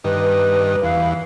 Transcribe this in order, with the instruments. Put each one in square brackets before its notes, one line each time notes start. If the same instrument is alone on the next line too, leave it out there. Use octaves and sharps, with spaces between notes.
[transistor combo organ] G2 D#3 [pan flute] B4
[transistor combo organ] E2 [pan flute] F5